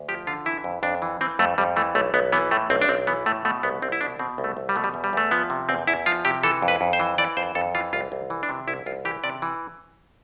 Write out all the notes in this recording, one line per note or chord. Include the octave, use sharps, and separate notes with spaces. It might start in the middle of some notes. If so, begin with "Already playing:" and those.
Already playing: D2
F3 G4
D3 F4
E3 E4
F2
F2 D4
E3
E3 C4
F2 A3
F2 G3
E3 A3
B1 A3
B1 B3
E3 B3
A2 A3
B1 C4
D4
B1 C4
E3 B3
A2 A3
B2 A3
C2 B3
C2 C4
E4
B2 D4
B2 C4
C2
A3
C2
G3
B2 A3
G3
E2
G3
E2 A3
F3 B3
C3
E2 C4
E2 E4
F3 F4
C3 G4
E3 A4
F2
B4
F2
C5
E3
E3 D5
F2 C5
F2 A4
E3 F4
C2 F4
C2
E3
D4
C3
C2 E4
C2 F4
E3 G4
C3 D5
E3